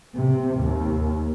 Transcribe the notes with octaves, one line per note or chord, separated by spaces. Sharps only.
C3
D#2